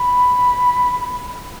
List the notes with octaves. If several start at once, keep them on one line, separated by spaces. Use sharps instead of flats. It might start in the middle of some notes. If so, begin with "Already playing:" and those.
Already playing: B5